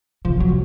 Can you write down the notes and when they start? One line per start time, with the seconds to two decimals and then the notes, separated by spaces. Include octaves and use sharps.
0.25 C3 F3
0.37 C#3 F#3
0.49 C3